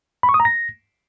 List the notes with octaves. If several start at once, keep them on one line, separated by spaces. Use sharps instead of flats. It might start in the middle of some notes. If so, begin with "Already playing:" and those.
B5
C#6
D#6
A#5
A#6